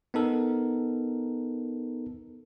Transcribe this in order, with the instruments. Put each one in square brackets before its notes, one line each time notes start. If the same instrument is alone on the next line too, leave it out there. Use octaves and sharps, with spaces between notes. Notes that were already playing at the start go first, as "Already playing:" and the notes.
[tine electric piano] B3 D#4 A4 A#4